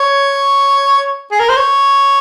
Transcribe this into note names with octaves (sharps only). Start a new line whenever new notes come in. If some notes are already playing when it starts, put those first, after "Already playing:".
Already playing: C#5
G#4
A#4
C5
C#5